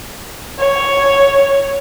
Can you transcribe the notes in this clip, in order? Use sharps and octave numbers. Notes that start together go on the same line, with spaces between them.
C#5